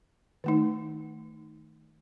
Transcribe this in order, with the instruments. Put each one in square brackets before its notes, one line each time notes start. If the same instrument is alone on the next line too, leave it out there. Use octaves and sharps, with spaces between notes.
[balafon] D#3 A3 D#4